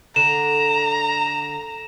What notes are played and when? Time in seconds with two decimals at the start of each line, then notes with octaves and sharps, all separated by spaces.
0.16 D3 A#5 E7